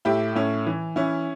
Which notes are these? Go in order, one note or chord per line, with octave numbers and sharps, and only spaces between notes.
A2 E4 G4
A2 C#4 E4
E3
E3 C#4 E4